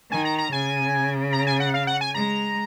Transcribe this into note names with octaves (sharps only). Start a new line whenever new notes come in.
D#3 G#5
A#5
A#5
C#3 G#5
A#5
G#5
F#5
F5
F#5
G#5
G#3 A#5